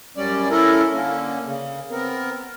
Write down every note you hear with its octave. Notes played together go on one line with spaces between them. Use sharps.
F#2 G3 C#4 D5
C#4 E4 A4 A#4
D3 A#3 C#4
C#3
B3 C4 A#4